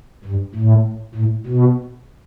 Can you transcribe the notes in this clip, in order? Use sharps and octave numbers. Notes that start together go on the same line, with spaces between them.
G2
A2
A2
B2